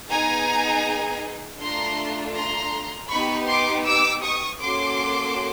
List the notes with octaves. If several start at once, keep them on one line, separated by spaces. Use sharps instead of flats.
B3 D#4 G#4 G#5 A#5
A3 D4 F4 A4 A#5 C6
A#5 C6
B3 D#4 G4 B5 C#6
C6 D6
D6 E6
C#6 D#6
A#3 C#4 F#4 A4 C6 D6